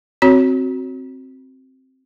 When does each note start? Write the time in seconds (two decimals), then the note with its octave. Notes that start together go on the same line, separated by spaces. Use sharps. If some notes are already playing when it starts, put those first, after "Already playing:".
0.22 C4 F#4 C#5